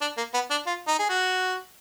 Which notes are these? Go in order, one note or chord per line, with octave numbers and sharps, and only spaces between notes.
D4
A#3
B3
D4
F4
D#4
G#4
F#4